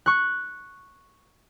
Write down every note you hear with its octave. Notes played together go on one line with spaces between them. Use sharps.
C#6 F#6